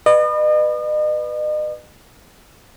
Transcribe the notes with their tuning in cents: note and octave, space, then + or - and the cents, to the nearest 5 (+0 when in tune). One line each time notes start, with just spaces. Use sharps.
B4 +0 D#5 -40